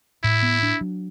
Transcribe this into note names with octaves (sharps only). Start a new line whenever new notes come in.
A2 E4
B3
D4
F#3